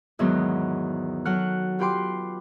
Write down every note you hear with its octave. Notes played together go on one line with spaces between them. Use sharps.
E2 G#2 D#3 F#3 G#3 B3
F#3 A4 F#5 F6 F#6
F4 G4 B4 G5 C6 D6